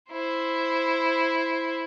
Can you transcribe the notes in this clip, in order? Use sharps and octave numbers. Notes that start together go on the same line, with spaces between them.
E4 C5